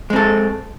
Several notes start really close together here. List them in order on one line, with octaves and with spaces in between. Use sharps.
G#3 C4 A4